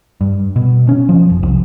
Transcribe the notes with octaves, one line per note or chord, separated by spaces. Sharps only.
G2
B2
C#4
F3
F1
C2